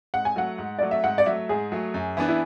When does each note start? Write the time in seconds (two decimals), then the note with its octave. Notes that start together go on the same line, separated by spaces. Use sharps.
0.14 G#2 F#5
0.25 G#5
0.36 F#3 A3 F#5
0.58 G#2
0.79 F#3 A3 D5
0.91 E5
1.04 G#2 F#5
1.18 D5
1.26 F#3 A3 E5
1.49 G#2 G#4
1.72 F#3 A3
1.94 F#2
2.17 E3 B3 D4
2.28 E4